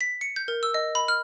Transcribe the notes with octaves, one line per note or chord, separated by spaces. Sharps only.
B6
C#7
G6
A#4
E6
D#5
B5
F6